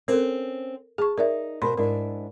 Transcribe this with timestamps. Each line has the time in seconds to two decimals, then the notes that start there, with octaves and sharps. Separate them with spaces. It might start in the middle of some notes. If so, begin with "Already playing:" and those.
0.08 C4 C#4 A4 A#4 C5
0.98 G#4 A5 C#6
1.18 D#4 A#4 D5 E5
1.62 B2 A#4 C5 B5 C6
1.77 G#2 D4 E4 A#4